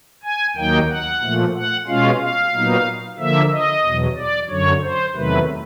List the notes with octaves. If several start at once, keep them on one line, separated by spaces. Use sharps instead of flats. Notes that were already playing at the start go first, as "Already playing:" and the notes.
G#5
D#2 D#3 F#3 A#3 D#4 G5
F#5
A#2 F3 A3
F#5
B2 G#3 C#4 F4 F5
F5
A#2 F#3 B3 D#4
D3 F3 A#3 E5
D#5
E2 B2 F#3
D5
F#2 D3 F#3 C#5
C5
E2 C3 D#3 F#3 A3 B4